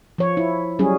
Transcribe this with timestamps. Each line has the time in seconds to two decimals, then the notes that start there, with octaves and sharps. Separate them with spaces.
0.18 F3 C#5
0.37 E4
0.79 F#3 G3 C#4 G#4